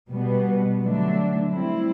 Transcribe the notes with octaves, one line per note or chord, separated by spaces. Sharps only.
B2 G3 B3
D3 F#3 A3 D4
G3 C4 E4